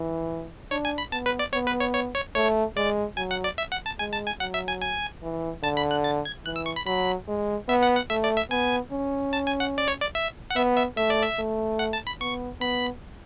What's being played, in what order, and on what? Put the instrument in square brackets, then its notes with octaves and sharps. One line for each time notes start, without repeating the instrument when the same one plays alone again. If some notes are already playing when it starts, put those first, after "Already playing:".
Already playing: [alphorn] E3
[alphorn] D4 [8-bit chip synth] C#5
[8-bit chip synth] G#5
B5
[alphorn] B3 [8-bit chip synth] A5
[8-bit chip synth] B4
D5
[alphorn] B3 [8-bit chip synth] C#5
[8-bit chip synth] B4
C#5
C#5
C#5
[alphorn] A3 [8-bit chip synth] C#5
[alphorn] G#3 [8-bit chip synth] D5
[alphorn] F#3 [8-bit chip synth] G#5
[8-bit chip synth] F#5
D5
E5
F#5
A5
[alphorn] G#3 [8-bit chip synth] G#5
[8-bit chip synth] A5
G#5
[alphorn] F#3 [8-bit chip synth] F#5
[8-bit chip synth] E5
G#5
G#5
[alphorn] E3
[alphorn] D3 [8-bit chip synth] A5
[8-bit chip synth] B5
F#6
A6
G#6
[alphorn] E3 [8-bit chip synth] F#6
[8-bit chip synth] E6
C#6
B5
[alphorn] F#3 [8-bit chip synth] B5
[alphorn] G#3
[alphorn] B3 [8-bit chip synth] E5
[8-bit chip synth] F#5
F#5
[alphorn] A3 [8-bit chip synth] E5
[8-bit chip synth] D5
E5
[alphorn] B3 [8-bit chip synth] G#5
[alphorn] C#4
[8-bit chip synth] A5
G#5
F#5
D5
C#5
D5
E5
F#5
[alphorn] B3 [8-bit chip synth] E5
[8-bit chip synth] E5
[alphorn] A3 [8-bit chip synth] E5
[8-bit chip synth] D5
E5
[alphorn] A3
[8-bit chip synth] F#5
A5
B5
[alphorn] B3 [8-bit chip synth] C#6
[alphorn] B3 [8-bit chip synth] B5